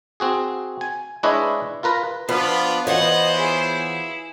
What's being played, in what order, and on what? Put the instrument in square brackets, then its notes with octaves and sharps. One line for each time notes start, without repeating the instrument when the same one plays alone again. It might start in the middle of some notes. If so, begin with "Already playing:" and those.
[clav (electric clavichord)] C4 F#4 G#4
G#5
G#3 D4 E4 B4 C#5 D#5
F4 A#4 B4 A#5
[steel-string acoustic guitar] F3 [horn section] B3 D4 F4 [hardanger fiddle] B4
[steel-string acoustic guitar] E3 F4 C#5 [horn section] B3 C5 [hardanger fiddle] D#5 F#5
[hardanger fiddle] E4 G#4